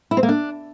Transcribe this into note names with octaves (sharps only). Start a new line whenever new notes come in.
E4
C4
A#3
D4